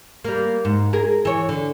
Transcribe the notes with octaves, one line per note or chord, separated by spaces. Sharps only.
G3 A#3
G#2
G#4 A#4
E3 C#5
D3